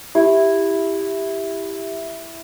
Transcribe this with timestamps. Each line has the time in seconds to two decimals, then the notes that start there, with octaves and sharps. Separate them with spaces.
0.15 E4 G4